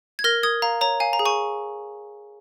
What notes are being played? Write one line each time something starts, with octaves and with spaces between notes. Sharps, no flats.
G#6
A#4 F6 A#6
A#4 D#6 G#6
F5 A#5
C#5 A#5
F5 G#5
A#5
G#4
G#5 C#6